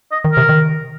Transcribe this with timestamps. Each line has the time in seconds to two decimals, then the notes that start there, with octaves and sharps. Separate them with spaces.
0.12 D#5
0.25 D#3
0.31 A#4
0.37 C3
0.49 D#3